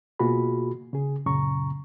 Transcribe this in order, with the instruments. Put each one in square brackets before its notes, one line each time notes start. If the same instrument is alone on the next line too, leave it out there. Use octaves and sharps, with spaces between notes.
[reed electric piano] B2 A#3 F4 F#4 G#4 B5
C#3 G#4
F#2 A#2 C#3 A#5 C#6